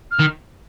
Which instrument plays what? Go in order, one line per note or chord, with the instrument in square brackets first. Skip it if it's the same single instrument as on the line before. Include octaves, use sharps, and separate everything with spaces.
[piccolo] F6
[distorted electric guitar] D#3